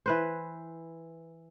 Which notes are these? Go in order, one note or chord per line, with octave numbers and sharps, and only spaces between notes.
E3 B4 C5